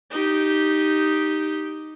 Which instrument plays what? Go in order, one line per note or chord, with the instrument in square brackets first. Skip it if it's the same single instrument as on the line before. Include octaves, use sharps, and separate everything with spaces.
[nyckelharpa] D#4 G4